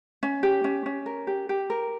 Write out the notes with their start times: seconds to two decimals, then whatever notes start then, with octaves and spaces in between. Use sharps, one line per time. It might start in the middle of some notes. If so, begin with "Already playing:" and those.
0.23 C#4
0.43 G4
0.64 C#4
0.86 C#4
1.06 A#4
1.27 G4
1.49 G4
1.70 A#4